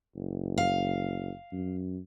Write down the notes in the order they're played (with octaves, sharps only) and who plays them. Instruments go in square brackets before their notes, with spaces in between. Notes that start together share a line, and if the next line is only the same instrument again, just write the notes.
[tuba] F#1
[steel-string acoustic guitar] F5
[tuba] F#2